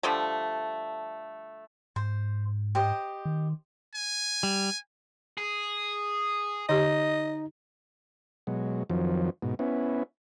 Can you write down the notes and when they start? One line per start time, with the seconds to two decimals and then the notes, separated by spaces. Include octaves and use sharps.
0.03 D3 F3 G3 A3
1.96 G#2 C5
2.75 G4 C5 D#5
3.25 D#3
3.95 G#5
4.43 G3
5.38 G#4
6.69 D3 D#4 G4 D#5
8.47 B2 F#3 G#3
8.90 F2 D#3 F3 F#3
9.42 G#2 B2
9.59 B3 C#4 E4